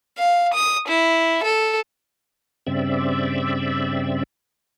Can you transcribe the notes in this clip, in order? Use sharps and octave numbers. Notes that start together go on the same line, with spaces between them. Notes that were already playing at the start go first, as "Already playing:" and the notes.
F5
D#6
E4
A4
G2 C#3 C4 D5 E5